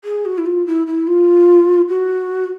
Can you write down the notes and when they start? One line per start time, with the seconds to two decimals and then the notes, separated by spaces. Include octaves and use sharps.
0.05 G#4
0.26 F#4
0.38 E4
0.46 F4
0.67 E4
0.87 E4
1.07 F4
1.89 F#4